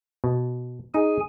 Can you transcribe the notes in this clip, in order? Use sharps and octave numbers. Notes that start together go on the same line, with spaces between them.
B2
D#4 G#4 G#5